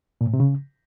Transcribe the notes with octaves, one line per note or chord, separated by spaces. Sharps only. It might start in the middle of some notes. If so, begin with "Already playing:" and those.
A#2
A2
C3
C#3